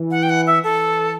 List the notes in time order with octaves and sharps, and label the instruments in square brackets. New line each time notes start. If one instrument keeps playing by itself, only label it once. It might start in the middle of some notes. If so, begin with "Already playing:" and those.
Already playing: [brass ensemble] E3
[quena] F#5
G5
F#5
E5
[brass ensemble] E3 [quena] A4